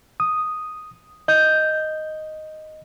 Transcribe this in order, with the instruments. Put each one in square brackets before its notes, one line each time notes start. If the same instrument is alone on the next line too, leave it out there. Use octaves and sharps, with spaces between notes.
[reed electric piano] D#6
[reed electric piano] D#5 [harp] G6